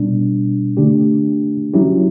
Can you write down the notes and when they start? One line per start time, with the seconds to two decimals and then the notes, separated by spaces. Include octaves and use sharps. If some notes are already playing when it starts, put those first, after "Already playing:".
Already playing: B2 G3 D4
0.77 D3 A3 D4 G4
1.74 F#3 C#4 E4 G4